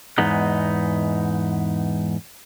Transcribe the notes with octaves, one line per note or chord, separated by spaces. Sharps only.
E2 G#2 G#3 B3 D#4